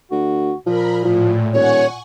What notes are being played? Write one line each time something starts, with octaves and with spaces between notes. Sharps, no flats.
D2 F#4
A#2 F3 A#4 B5
A2 F3
D#1 C#5 F#5 G#5 C#6